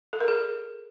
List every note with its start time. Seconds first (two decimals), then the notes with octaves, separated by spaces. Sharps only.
0.13 A4
0.20 A#4
0.28 G#4